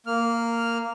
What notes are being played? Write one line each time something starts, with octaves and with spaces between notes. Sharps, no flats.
A#3 F6